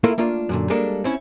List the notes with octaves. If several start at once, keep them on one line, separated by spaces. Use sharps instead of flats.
A3 A#3 E4 F4 A4 A#4
A3 A#3 D4 F4
F#2 A#2 D3
G3 G#3 A#3 D4 A4
C4 C#4 E4